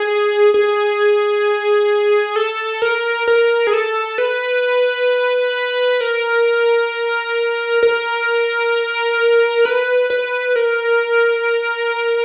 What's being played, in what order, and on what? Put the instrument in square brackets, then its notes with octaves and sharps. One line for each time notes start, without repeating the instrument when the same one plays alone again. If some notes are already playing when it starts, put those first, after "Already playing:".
Already playing: [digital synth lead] G#4
G#4
A4
A#4
A#4
G#4
A4
B4
A#4
A#4
B4
B4
A#4